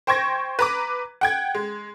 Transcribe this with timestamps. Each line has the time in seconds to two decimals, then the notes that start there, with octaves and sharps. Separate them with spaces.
0.07 C5 G5 C6 C#6 G#6 A#6
0.59 B4 A#5 D6
1.21 F#5 G5 G#6
1.55 G#3